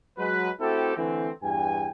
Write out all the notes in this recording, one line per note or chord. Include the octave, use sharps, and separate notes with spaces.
F#3 G#3 B4
A3 C4 E4 F#4 G4 A4
D3 E3 A3 C4
E2 G2 G5 G#5